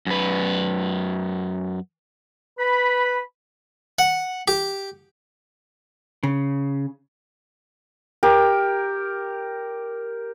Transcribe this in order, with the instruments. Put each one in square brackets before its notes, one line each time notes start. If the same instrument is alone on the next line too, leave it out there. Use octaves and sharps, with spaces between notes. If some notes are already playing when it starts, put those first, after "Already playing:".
[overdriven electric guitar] F#2 B4
[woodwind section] B4 B5
[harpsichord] F#5
G4
[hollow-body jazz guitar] C#3
[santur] G4 A#4